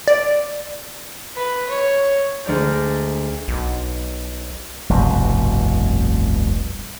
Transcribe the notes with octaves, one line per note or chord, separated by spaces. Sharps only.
D5
B4
C#5
D2 G#3 D5 A#5 G6
B1
F1 C2 G2 B2